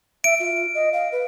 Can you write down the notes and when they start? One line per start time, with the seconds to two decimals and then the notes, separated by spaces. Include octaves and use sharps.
0.24 E5 D7
0.40 F4
0.75 D#5
0.93 F5
1.12 B4